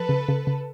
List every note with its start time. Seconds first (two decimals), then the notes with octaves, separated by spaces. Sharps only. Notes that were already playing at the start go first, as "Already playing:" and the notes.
Already playing: F3 A4 B4
0.09 C#3
0.29 C#3
0.47 C#3